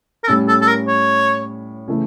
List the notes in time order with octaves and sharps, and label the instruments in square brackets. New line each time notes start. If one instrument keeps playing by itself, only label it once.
[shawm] A#4
[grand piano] A2 G3 C#4 [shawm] A4
[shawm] A4
A4
A#4
C#5
[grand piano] C#3 E3 A3